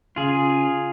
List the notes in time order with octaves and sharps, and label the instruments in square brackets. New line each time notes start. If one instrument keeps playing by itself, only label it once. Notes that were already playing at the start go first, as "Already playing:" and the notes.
[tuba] C#3 [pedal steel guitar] F4 G#4